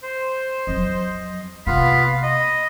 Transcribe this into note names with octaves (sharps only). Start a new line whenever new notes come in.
C5
F2 F#3 D#5
C3 A#3 B3 F4 F5 B5
D#5 B5